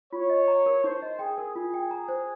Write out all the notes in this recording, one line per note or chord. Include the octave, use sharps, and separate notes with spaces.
F4 C#5
D#5
A#5
A#4
D#4 C5
D#5
G#4 G5
A#4
F4 G#4
G5
A#5
C5